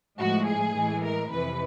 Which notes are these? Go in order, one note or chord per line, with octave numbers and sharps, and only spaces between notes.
A2 F3 G#3 F#4
G#4
A2 E3 G#3
A#4
F2 C3 E3 B4